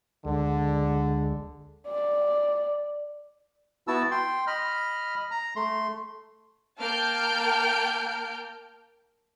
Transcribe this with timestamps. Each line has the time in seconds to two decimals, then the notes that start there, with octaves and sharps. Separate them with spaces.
0.25 D2 D3 G#3
1.89 D5
3.88 B3 E4 F#4 A5 E6
4.11 G5 C6
4.47 D#5 B5 F6
5.31 A#5
5.56 A3 C6
6.78 A#3 G5 A5 F6 G6 D7